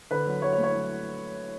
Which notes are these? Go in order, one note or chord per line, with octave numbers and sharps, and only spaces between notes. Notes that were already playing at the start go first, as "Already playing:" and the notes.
D3 B4
F#3
F#3 C#5
C#5
A3
C#5
F#3